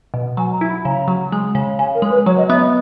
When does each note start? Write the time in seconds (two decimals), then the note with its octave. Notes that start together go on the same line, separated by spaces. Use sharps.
0.14 B2
0.37 F#3 G#5
0.53 A#5
0.61 E4
0.69 B5
0.85 C#3 A#5
1.08 F#3
1.32 G#3
1.55 C#3
1.79 C#3 G#5
1.95 A#4
2.02 G#3
2.11 B4
2.26 F#3 C#5
2.38 D#5
2.49 B3 E5
2.60 D#5